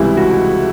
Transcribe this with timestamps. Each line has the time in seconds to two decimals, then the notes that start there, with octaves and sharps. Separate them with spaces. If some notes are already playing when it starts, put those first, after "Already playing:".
Already playing: C#2 C3 E3 G3 E4
0.17 F#4